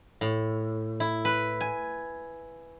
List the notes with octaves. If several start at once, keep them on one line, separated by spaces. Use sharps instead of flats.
A2
E4
B4
G#5